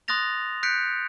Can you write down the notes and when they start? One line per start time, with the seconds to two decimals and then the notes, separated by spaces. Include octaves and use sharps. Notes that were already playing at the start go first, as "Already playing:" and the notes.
0.08 C6 D#6 F#6 A6 A#6 F7
0.63 F#6 G6 B6 C#7 D7